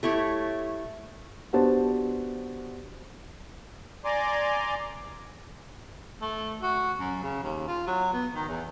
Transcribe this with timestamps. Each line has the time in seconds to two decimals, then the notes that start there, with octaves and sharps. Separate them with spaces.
0.03 A3 E4 G4 C#5
1.53 B3 D4 F#4 G4 C5 A5
4.05 D5 G#5 A#5 C6 D6
6.21 A3
6.62 F#4
7.00 F#2
7.23 C#3
7.43 D#2
7.68 F4
7.87 F#3
8.13 B3
8.35 D#3
8.48 E2